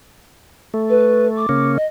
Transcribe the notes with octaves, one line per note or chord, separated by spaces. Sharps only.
A3
B4
D6
C#3 A#3 C#4
D#5